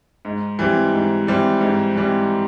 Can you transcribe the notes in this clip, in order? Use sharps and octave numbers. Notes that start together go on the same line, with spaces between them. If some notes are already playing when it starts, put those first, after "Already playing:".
G#2
E3 G3 C4
G#2
E3 G3 C4
G#2
E3 G3 C4